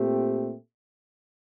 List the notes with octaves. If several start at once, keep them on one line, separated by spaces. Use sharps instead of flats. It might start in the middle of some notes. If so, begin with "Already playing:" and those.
Already playing: A#2 A3 C4 G4